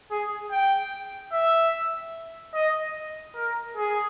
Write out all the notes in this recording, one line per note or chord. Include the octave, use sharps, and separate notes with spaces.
G#4
G5
E5
D#5
A#4
G#4